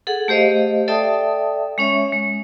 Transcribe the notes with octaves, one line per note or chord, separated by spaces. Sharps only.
G#4 A4 F#5
A3 G4 C5 D#5 F5
A4 D5 E5 G5 A5 D#6
G#3 C#4 C#5 E5
G#3